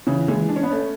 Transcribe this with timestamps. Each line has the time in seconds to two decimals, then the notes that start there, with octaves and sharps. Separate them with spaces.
0.07 C#3 E3
0.28 E3 G#3
0.49 D4
0.56 C#4
0.63 B3
0.71 A3 C#4